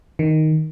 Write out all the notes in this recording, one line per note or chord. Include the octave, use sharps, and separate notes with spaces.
D#3